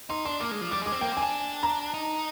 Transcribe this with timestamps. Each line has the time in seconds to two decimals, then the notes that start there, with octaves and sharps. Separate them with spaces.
0.10 D#4 C6
0.25 D4 C6
0.40 A#3 D6
0.51 G#3
0.61 F3
0.71 G3 D6
0.82 G#3 D6
0.92 C4
1.01 A#3 G5
1.12 C4 G#5
1.22 D4
1.63 A#5
1.94 D#4